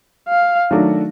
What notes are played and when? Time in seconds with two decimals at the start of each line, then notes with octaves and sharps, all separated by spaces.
0.28 F5
0.71 D#3 F#3 A3 D4 F#4